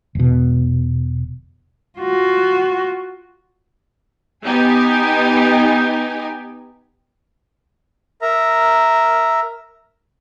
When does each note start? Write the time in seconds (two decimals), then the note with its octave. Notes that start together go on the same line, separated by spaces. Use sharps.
0.15 E1 B2
1.99 F4 F#4
4.45 B3 D#4 G4 G#5
8.22 A#4 E5 A#5